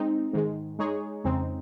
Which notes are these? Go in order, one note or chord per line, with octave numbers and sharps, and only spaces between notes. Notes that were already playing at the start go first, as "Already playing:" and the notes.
Already playing: G#3 C4 D#4
G#2 D#3 G#3
G#3 D#4 G#4 C#5
F2 C#3 G#3 C4 D#4